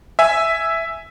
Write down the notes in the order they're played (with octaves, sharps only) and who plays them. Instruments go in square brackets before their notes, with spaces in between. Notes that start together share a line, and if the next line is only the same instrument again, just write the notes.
[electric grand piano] E5 G#5